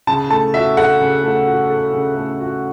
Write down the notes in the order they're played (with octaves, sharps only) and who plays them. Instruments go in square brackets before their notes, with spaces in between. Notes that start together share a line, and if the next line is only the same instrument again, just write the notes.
[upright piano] C#3 [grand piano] A5
[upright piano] A3 [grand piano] A5
[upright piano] F#4 [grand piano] E5
[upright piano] A4 [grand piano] F#5
[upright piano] C#3
A3
F#4
A4
C#3
A3
F#4